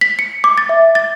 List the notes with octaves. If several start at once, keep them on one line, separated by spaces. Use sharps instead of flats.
B6
C#7
D6
A6
E5
A6